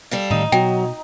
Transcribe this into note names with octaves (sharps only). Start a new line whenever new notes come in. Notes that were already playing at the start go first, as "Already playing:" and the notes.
G3 A4 F5
A2 D#3 D#4
B2 F#3 G5